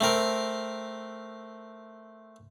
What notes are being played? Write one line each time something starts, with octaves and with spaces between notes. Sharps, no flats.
A3 C4 A#4